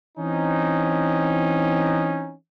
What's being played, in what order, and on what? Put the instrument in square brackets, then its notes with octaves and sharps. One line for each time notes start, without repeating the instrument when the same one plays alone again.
[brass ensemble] E3 C4 C#4 D#4